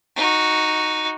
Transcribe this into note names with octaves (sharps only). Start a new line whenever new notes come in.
D#4 F#4